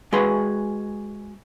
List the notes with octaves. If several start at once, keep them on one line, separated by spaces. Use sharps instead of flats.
G#3 F#4 G#4 B4 C6